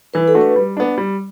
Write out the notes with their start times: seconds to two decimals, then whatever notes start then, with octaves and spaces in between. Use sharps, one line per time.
0.14 E3 B4
0.28 A4
0.35 A3 D4 F#4
0.41 B4
0.56 G3
0.77 B3 D4
0.98 G3